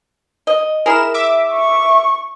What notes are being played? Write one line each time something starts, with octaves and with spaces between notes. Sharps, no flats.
D#5
E4 G#4 A#4 E7
E5 D6
C#6